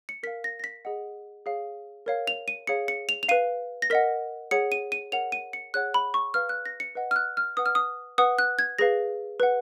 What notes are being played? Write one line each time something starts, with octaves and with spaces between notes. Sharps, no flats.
C#7
A#4 F5 B6
A#6
A#6
B6
G#4 D#5 F#5
G#4 C#5 F5
A#4 C#5 F5
F7
D#7
G#4 C#5 F5 C#7
C#7
F7
F7
B4 F5 D#7
A#6
A#4 D#5 F#5 B6
G#4 C#5 F#5 C#7
D#7
D#7
A#4 C#5 F#5 F7
D#7
C#7
G#4 C#5 F#5 F#6
B5
C#6
B4 F5 F6
F#6
A#6
C#7
B4 D#5 F#5
F6
F#6
F6
B4 F#5 D#6
F6
D#6
B4 F#5 D#6
F#6
G#6
G#4 B4 F5 A#6
B4 F#5